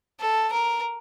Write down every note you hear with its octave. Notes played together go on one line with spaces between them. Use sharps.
A4
A#4